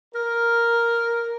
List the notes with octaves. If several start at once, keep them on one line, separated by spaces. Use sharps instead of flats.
A#4